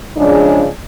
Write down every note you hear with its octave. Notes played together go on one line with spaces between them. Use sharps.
C#3 F3 G#3 D4